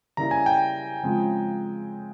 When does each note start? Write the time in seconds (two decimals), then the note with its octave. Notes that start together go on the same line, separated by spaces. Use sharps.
0.17 C#3 G3 A#3 E4 A#5
0.31 G#5
0.46 G5
1.03 C#3 F3 G#3 C4